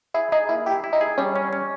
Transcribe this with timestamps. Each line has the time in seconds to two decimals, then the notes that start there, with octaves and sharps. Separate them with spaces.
0.14 E4 G#4
0.32 D#4 G#4
0.49 A#3 E4
0.66 E4 G4
0.84 E4
0.93 D#4
1.01 G#4
1.18 G3 C#4
1.36 C#4
1.53 C#4